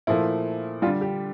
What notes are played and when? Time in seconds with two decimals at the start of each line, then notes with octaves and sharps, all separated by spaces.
0.07 A#2 F3 A3 E4
0.82 G3 F4
0.87 D3
1.01 G4